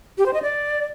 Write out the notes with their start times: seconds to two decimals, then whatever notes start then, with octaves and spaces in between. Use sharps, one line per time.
0.18 G4
0.26 C5
0.34 D#5
0.42 D5